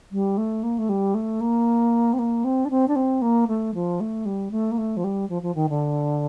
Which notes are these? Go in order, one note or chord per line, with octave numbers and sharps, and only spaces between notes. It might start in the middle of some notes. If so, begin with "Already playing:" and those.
G3
A3
A#3
A3
G3
A3
A#3
C4
A#3
C4
D4
C4
D4
C4
A#3
A3
F3
A3
G3
A3
A#3
A3
F3
G3
F3
F3
D#3
D3